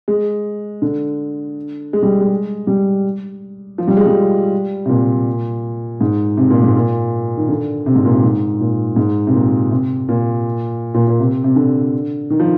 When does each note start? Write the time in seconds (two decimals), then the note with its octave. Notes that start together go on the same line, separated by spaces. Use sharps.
0.08 G#3
0.82 D3
1.93 G#3
2.03 G3
2.21 G#3
2.67 G3
3.78 F3
3.88 G3
3.97 G#3
4.06 G3
4.86 C3
4.89 A#2
6.01 G#2
6.37 C3
6.50 A#2
6.63 G#2
6.77 A#2
7.37 D#3
7.49 D3
7.86 C3
7.95 G#2
8.05 A#2
8.13 C3
8.23 G#2
8.61 A#2
8.96 G#2
9.27 C3
9.34 A#2
9.71 C3
10.09 A#2
10.94 A#2
11.07 A#2
11.20 C3
11.44 C3
11.56 D3
12.30 D#3
12.40 F3